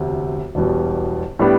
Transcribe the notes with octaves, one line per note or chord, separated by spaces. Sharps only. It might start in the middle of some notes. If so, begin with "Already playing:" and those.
Already playing: E1 D2 C3
E1 E2 B2 G3
A2 G3 B3 D4